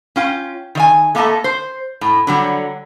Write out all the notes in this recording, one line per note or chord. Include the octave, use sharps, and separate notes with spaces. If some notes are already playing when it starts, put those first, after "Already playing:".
C#4 F4 G5
D#3 D#5 G#5
A3 A#3 A4 D#5 A5
C5
A2
D3 F#3 G3